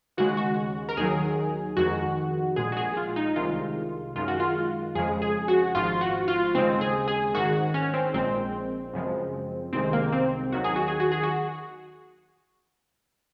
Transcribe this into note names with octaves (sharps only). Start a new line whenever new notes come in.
D#2 C#3 G#3 F#4
F#4
A#4
D#2 D#3 F#3 G#4
F2 D#3 G#3 F#4
A#1 A#2 G#3 G#4
F#4
G#4
F4
D#4
C2 C3 D#3 G#3 F4
F#2 D#3 G#3 F4
F#4
F4
F2 C#3 F3 G#3 G#4
G#4
F#4
G#1 G#2 F3 F4
F#4
F4
D#2 C#3 G#3 C4
G#4
G#4
G#1 G#2 D#3 F#4
C#4
C4
A#1 A#2 G#3 C4
F#2 C#3 F3 G#3
C2 C3 D#3 G#3 C4
A#3
C4
D#2 D#3 F#3 F#4
G#4
F#4
G#4
F#4
G#4
F#4